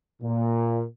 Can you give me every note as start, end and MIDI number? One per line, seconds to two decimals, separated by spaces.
0.22 0.83 46